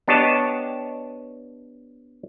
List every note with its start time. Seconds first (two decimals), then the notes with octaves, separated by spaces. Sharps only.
0.08 B3 D4 G4 C#5 D#5 A5